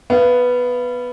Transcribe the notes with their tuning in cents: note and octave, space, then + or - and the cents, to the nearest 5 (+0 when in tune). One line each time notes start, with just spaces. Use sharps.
B3 +0 F5 -30